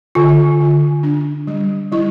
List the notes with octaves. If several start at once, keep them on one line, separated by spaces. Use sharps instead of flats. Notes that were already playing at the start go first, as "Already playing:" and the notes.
D3 F4
D3
D4
G3
G3 E4